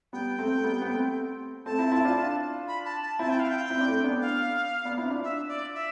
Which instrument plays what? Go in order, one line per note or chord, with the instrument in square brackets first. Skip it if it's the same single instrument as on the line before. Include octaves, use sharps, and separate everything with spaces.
[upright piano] G3 B3 [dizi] G5
[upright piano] A3 C4
A3
G3 B3
B3
A3 C4
[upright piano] A3 C4 [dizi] A5
[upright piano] C4 E4
C4 E4
D4 F4
[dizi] B5
A5
A5
[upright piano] C4 E4 [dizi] A5
[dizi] G5
F5
G5
[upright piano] C4 E4
D4
A3 C4
B3 D4
[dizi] F5
[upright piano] B3 D4
C4 E4
D4 F4
[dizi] E5
D5
E5